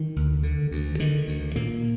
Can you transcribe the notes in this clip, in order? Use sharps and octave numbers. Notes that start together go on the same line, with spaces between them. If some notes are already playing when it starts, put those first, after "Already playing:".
Already playing: D#3
D2
D3
D2
D3 D#3
D2
A#2 A#3